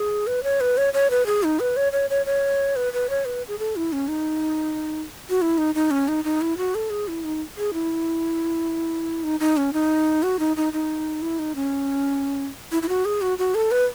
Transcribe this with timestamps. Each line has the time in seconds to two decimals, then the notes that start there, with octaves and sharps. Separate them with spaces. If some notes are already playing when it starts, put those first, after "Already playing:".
Already playing: G#4
0.27 B4
0.44 C#5
0.61 B4
0.77 C#5
0.94 C#5
1.10 B4
1.26 G#4
1.43 D#4
1.60 B4
1.77 C#5
1.92 C#5
2.10 C#5
2.26 C#5
2.76 B4
2.93 B4
3.10 C#5
3.25 B4
3.48 G#4
3.59 A4
3.76 E4
3.93 C#4
4.08 D#4
5.30 F#4
5.42 E4
5.58 D#4
5.75 D#4
5.91 C#4
6.08 D#4
6.24 D#4
6.41 E4
6.57 F#4
6.75 A4
6.90 G#4
7.08 E4
7.24 D#4
7.57 G#4
7.73 E4
9.24 D#4
9.40 D#4
9.57 C#4
9.73 D#4
10.23 F#4
10.39 D#4
10.57 D#4
10.73 D#4
11.22 E4
11.39 D#4
11.55 C#4
12.72 E4
12.83 E4
12.89 F#4
13.05 G#4
13.21 F#4
13.38 F#4
13.55 A4
13.71 B4